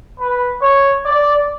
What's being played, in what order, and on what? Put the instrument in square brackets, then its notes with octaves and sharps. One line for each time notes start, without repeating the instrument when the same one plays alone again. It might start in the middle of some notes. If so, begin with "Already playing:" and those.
[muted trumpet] B4
C#5
D5